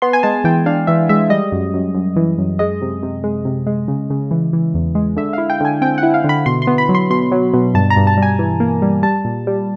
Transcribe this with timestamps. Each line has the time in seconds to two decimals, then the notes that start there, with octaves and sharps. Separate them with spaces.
0.02 B3 C6
0.13 G#5
0.23 G#3 A5
0.44 E3 G5
0.66 D4 F5
0.87 E3 E5
1.09 G#3 E5
1.30 G3 D#5
1.52 F#2
1.74 F#2
1.95 F#2
2.16 E3
2.38 F#2
2.59 G#3 D#5
2.82 C3
3.03 C3
3.24 G#3
3.45 C3
3.67 G#3
3.88 C#3
4.10 C#3
4.31 E3
4.53 E3
4.74 E2
4.95 G#3
5.17 D3 E5
5.33 E4 F5
5.50 G5
5.61 D3 G#5
5.82 C4 G5
5.98 F#5
6.03 E4
6.14 F5
6.24 D3
6.29 B5
6.46 B2 C6
6.62 C6
6.67 B3
6.78 B5
6.89 F#3
6.95 C6
7.10 B2 C6
7.31 F#3
7.54 B2
7.74 G2 A5
7.90 A#5
7.96 G2
8.07 A5
8.17 G3
8.22 G#5
8.39 E3
8.60 A#3
8.82 G3
9.03 G3 A5
9.25 A#2
9.47 G3